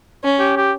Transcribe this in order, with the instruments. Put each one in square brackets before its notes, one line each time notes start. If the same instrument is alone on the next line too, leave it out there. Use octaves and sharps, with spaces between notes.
[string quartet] C#4
[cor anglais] G4
G4